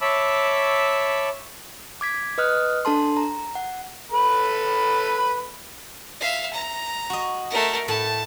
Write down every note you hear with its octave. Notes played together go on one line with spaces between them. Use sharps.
C#5 E5 A5 B5 D6 E6
D6 G#6 B6
B4 D#5 D#6 F6 F#6
D4 A4 A5 C6
A#5
F#5
A4 B4 B5
E5 F5
A#5
F#4 D#5
A3 A#4
A2 A3 A5 B5